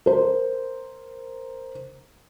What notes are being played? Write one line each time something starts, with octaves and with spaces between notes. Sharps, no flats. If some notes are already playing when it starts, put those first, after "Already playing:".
A#4 C5